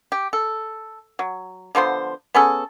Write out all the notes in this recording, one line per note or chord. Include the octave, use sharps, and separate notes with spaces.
G4
A4
F#3
D3 F3 B3 C5
B3 C#4 G#4 A4